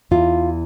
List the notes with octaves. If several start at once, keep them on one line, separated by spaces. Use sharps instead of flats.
E2 E3 F4